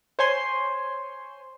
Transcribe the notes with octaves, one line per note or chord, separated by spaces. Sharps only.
C5 C#5 G#5 C6